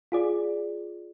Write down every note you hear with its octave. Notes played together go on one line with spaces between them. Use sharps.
F4 G#4 D5